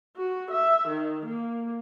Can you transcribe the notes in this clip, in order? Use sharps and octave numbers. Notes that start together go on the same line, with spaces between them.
F#4
E5
D#3
A#3